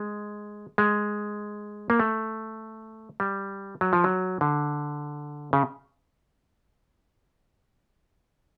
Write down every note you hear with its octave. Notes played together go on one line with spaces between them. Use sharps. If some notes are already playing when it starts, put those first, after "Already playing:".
Already playing: G#3
G#3
A#3
A3
G3
F#3
F3
F#3
D3
C#3